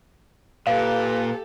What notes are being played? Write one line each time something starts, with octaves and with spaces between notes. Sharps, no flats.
A#2 G4 A4 B4 F5